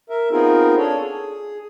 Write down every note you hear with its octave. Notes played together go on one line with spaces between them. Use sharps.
A#4 E5
B3 C4 D#4 F4 G#4 A#4
D4 G#4 A4 C#5
G#4